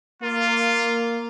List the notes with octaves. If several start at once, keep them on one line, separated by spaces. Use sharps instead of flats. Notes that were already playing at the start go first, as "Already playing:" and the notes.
A#3 F4